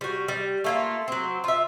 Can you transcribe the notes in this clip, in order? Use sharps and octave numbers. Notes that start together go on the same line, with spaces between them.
G3 F#4
G3
A3 A#3 F4
F#3 C4
F4 E5